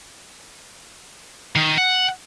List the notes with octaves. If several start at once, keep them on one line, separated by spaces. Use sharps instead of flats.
D#3
F#5